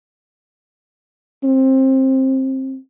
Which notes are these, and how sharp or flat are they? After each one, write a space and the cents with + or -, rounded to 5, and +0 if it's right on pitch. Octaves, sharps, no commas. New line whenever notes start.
C4 +20